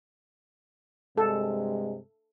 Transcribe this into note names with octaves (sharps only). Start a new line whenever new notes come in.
G2 C3 G#3 A4